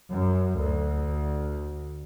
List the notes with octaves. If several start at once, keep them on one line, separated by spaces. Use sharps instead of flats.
F#2
D2